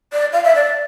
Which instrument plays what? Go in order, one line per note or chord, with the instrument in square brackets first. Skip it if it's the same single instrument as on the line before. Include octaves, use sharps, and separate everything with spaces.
[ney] D5
F5
E5
D5